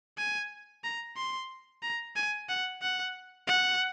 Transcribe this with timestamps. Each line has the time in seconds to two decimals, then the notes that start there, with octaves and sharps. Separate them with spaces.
0.18 G#5
0.84 A#5
1.17 C6
1.83 A#5
2.16 G#5
2.49 F#5
2.82 F#5
3.47 F#5